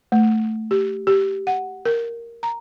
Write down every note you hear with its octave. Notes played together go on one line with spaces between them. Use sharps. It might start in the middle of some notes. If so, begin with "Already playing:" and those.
A3
G4
G4
F#5
A#4
A#5